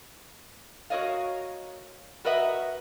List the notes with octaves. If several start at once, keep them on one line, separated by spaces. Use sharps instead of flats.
F#4 A#4 C#5 D#5 F5
F#4 A#4 B4 D#5 E5 F#5